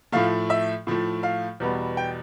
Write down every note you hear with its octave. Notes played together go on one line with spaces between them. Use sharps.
A2 F3 A3 F5
E5
A2 F3 A3
F5
E2 B2 G3 B3
G5